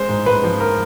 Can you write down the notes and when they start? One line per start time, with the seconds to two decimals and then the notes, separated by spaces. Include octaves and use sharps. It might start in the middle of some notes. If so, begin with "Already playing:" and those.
Already playing: G#3 C5
0.09 G#2
0.26 G#2 B4
0.44 F3
0.60 A#4